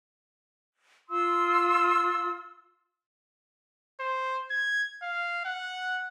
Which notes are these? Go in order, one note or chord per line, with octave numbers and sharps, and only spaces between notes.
F4 F5 C6 E6
C5
G#6
F5
F#5